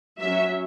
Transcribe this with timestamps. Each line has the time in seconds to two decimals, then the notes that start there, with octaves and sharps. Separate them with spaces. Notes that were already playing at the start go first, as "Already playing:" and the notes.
0.19 F#3 C#4 E5